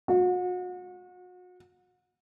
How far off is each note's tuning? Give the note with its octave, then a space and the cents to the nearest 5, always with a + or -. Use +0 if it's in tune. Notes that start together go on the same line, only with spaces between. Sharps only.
F#4 -35